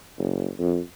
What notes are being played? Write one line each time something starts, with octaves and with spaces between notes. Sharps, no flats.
F#1
F2